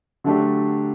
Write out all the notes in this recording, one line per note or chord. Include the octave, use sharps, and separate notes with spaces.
D3 F#3 A3 D4 G4